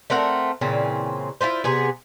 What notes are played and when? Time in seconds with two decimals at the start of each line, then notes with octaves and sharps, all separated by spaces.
0.10 A3 C4 A#4 F#5
0.61 A#2 C#3 E3 C4
1.41 E4 F4 B4 C5
1.64 C3 B3 G#4